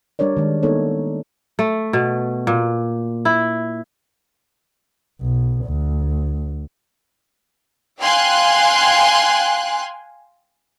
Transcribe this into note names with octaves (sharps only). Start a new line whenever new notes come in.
G3 D4 A#4 C#5 D5
D#3 G#3
A#3 B3 D#4 A4 C#5
A3
B2
A#2
E4
B1
D2
F5 G5 G#5 C6 F#6